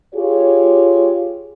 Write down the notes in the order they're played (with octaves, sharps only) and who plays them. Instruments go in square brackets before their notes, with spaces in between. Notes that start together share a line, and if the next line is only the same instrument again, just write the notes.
[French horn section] F4 G4 G#4 C#5